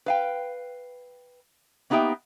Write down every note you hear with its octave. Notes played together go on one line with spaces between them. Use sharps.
B4 F5 G5
A#3 B3 D#4 G4 E5 G5